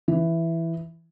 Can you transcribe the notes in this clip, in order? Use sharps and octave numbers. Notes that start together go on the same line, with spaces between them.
E3